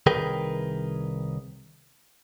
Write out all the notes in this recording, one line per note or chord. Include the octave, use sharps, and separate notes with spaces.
C2 D#3 G#4 A#4 B4 G5